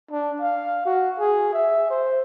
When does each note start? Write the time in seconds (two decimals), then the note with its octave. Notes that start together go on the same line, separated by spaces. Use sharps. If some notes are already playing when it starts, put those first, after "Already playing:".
0.11 D4
0.41 F5
0.85 F#4
1.19 G#4
1.53 E5
1.90 C5